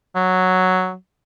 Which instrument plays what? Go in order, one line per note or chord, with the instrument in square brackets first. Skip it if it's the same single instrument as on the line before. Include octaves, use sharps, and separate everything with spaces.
[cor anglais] F#3